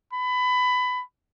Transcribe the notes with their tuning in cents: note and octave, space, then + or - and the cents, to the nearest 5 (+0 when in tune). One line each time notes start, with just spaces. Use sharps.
B5 +20